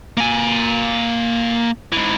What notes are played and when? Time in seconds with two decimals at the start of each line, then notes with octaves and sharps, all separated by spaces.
0.17 A#3 G#5
1.92 G#2 E3